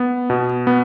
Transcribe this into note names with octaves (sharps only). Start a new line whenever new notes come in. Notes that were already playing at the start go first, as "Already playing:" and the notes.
Already playing: B3
B2
B3